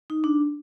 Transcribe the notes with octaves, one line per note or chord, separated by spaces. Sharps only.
D#4
D4